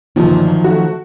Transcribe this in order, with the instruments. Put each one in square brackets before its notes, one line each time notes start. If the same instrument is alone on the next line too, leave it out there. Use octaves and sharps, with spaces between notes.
[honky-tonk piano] G1 A#2 [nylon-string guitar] D#3 F3 F#3
[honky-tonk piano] A3 F#4